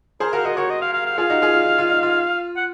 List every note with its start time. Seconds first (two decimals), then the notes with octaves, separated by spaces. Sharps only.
0.20 G#4 A#4 C5
0.33 F#4 A#4 F5
0.44 F#4 A#4 D#5
0.57 F#4 A#4 C#5
0.70 D#5
0.82 F5
0.93 F5
1.06 F5
1.18 F4 G#4 F5
1.30 D#4 F#4
1.42 F4 G#4
1.54 F4
1.66 D#4
1.78 F4
1.90 D#4
2.03 F4
2.56 F#5